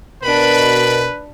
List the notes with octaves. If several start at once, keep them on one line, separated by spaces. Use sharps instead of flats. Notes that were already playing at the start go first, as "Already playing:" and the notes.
B2 D4 A#4 B4 B5